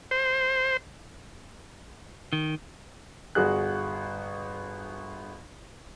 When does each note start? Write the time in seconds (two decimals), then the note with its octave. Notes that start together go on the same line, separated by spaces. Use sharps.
0.11 C5
2.33 D#3
3.35 G1 F#4 G#4 F#6